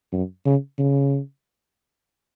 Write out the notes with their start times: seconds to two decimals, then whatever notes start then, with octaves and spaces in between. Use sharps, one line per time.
0.12 F#2
0.45 C#3
0.78 C#3